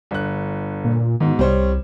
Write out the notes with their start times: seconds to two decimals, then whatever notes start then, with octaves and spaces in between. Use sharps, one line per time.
0.11 G1 F#6
0.84 A#2
1.20 G#2 B2 D#3
1.39 C2 G3 C5 C#5